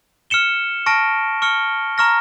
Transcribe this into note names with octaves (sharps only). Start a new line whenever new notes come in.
F6 C#7 E7 G7
A5 C#6 F6 A#6 D7
C#6 F6 C#7 G7
A#5 C#6 F6 A#6